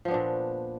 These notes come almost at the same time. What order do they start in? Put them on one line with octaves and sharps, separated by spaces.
F3 B3 D4 A#2